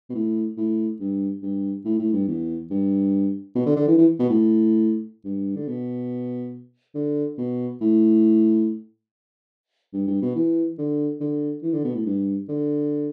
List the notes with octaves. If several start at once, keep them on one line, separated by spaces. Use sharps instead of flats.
B2
A2
A2
G2
G2
A2
A2
G2
E2
G2
B2
D3
D3
E3
E3
B2
A2
G2
D3
B2
D3
B2
A2
G2
G2
B2
E3
D3
D3
E3
D3
B2
A2
G2
D3